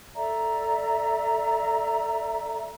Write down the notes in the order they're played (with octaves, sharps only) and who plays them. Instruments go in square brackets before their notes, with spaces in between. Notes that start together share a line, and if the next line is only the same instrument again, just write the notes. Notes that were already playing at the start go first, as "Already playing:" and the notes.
[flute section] A4 D5 E5 A#5